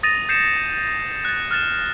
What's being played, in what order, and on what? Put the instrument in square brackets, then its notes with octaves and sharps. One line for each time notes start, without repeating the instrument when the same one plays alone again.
[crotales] D#6 A6 A#6 D#7 F7
G6 C7 C#7 E7
F#6 A6
F6 F#6 A6 E7